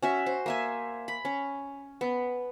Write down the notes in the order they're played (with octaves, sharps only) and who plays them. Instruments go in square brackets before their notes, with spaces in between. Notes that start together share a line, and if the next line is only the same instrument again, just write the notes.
[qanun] C#4 F#4 E5
C5
A#3 E5 G#5
B5
C#4
B3